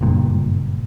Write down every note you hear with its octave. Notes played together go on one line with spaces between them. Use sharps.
F#1 G2 A#2